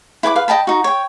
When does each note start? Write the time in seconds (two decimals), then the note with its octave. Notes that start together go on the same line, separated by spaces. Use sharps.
0.23 E4 B4 G5 D6
0.36 B4 F5
0.48 D#5 G5 A5 B5
0.67 D#4 F#4
0.84 C#5 G5